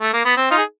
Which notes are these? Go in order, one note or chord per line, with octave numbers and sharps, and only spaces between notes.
A3
A#3
B3
C4
D#4 F4
G#4